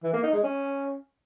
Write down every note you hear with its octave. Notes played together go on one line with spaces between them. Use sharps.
E3
A#3
D#4
G#3
C#4